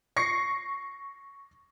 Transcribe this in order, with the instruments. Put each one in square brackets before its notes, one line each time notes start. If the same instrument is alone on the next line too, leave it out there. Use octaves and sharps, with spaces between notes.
[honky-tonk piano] C#6 A#6 C7 C#7